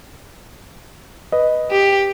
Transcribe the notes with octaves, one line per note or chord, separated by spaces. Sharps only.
B4 D#5
G4